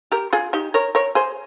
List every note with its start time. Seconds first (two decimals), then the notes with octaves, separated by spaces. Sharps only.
0.12 G4 A#4
0.33 F4 G#4
0.53 D#4 G4
0.74 A#4 C#5
0.95 A#4 C#5
1.15 G#4 C5